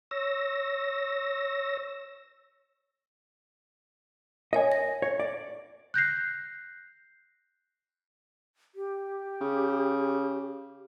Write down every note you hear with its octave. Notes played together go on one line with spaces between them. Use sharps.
C#5 E6 A#6
A#4 C#5 D#5 G#5
A#6
C#5
D5
F#6 G6 A#6 C7
G4
C#3